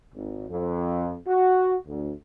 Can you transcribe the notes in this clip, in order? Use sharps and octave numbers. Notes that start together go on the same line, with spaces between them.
G#1
F2
F#4
D2